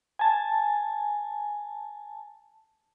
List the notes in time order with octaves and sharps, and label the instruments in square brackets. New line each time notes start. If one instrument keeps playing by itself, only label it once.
[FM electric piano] G#5 A5